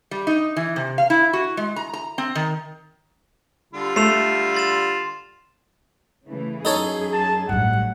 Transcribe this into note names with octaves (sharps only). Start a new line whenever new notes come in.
G3
D#4
E3
C3
F5
E4
F#4
G#3
A#5
A#5
C4
D#3
D3 G3 F4
A3 C7 E7 F7
C6 A6 E7
C#3 E3 A3
F#2 D#4 G#4 A4 C#5
A5
A1 G2 F#3 G3 A3 F#5